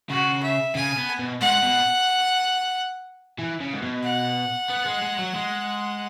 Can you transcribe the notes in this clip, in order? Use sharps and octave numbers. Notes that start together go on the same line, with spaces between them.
C#3 F#4
E5
C#3 G#5
B3
B2
G#2 F#5
B2
E3
C#3
G#2
B2
F#5
B3
G#3
G#3
F#3
G#3